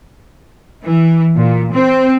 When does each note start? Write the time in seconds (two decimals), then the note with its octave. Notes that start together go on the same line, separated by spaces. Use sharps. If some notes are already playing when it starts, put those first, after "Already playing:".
0.84 E3
1.36 A#2
1.73 C4